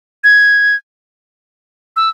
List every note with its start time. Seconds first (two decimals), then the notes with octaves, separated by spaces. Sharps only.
0.24 G#6
1.96 E6